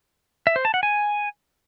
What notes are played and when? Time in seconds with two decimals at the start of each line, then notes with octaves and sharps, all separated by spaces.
0.47 E5
0.56 C5
0.65 A5
0.74 F#5
0.83 G#5